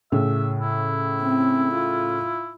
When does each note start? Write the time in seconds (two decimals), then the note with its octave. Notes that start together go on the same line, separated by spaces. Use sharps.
0.12 A2 C#3 E5
0.60 E4
1.20 C4
1.74 F4